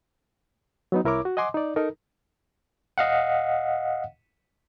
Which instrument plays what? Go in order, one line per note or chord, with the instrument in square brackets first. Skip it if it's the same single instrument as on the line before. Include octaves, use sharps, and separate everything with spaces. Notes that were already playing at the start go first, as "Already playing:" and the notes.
[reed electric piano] F#3 B3 D#4
C2 E4 A#4 C#5 D6
F#4
D#5 F#5 G#5 C6 D6
D#4 D5
D#4 A4 A#4
[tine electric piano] D#5 F5 F#5